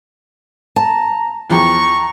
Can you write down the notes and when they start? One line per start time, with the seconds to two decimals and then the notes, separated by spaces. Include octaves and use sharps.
0.76 A5 A#5
1.50 E2 F3 G5 A#5 C#6